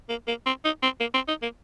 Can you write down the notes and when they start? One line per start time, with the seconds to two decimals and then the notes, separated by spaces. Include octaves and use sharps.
0.09 A#3
0.28 A#3
0.46 C4
0.65 D#4
0.83 C4
1.00 A#3
1.14 C4
1.28 D#4
1.42 A#3